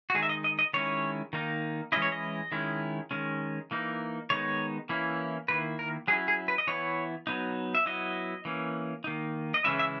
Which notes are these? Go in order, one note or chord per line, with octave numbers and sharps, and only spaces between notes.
F#4
D#3 G#3 D#4 G#4
E5
D#5
D#5
D#5
D#3 G#3 C#4 E4 C#5
D#3 A#3 D#4
E3 G#3 C#4 E4 D#5
C#5
D#5
D#3 G#3 C#4 E4
D#3 G#3 C#4
E3 A#3 D#4
D#3 G#3 B3 D#4 C#5
E3 A#3 C#4 E4
D#3 A#3 E4 B4
A#4
F#3 C#4 E4 G#4
G#4
B4
D#5
E3 B3 E4 C#5
F#3 B3 D#4
E5
F#3 B3 E4 D#5
E3 A#3 C#4
D#3 A#3 D#4
D#5
C#3 E3 G#3 C#4 E4 E5
E5